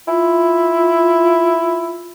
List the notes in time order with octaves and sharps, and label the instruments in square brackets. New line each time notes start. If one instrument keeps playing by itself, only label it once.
[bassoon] E4 [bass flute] F4